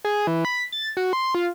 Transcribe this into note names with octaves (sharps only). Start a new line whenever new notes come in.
G#4
E3
B5
A6
F#4
C6
F4